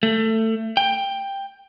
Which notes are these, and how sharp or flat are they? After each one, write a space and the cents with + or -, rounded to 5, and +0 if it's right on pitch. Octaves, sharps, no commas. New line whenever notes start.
A3 +20
G5 +10